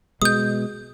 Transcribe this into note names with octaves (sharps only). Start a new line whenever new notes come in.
B2 G#3 D#6 G6